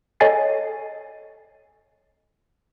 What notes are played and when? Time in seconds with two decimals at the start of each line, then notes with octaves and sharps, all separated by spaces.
0.20 A4 C#5 D#5 G#5 A6 C7